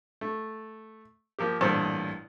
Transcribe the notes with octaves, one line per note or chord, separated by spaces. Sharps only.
A3
F3 A#3 G4
A1 G2 A#2 A4 C5